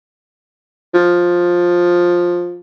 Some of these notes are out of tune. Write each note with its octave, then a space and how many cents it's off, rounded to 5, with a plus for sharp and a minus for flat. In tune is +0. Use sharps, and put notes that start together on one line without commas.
F3 +10